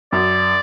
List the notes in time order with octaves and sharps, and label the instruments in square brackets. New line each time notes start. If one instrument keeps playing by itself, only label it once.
[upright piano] F#2 [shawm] D5